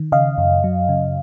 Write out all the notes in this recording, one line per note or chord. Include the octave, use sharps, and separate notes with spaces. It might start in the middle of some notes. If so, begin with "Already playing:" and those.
Already playing: D#3
C#3 D#5 F5
F#2
F#3
C#3